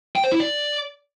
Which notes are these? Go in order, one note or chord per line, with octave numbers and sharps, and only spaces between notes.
G5
C5
E4
D5